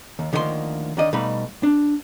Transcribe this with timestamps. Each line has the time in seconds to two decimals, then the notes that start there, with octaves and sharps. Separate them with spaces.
0.19 D#2
0.33 D2 D#3 F3 A#3 G#4 C6
0.97 D#2 D3 D#3 D5 D#5
1.13 B2 G3 A3 D#4 F5 B5
1.63 D4